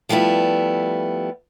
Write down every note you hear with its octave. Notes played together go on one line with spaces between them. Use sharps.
F3 G3 A3 B3 E4